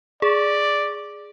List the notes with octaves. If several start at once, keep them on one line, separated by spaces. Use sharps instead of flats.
G#4 D5